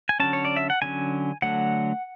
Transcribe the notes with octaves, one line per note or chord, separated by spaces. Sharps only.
G#5
D3 F#3 C#4 A5
C#5
D5
E5
F#5
D3 F#3 C#4 G#5
D3 F#3 A3 F#5